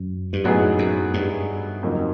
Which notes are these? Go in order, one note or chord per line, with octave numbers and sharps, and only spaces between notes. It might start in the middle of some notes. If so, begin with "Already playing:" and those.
Already playing: F#2
G2
F#2 A2 F#3 B3 D#4 G#4
F#2
G2
F2 C#3 F#3 A#3 D#4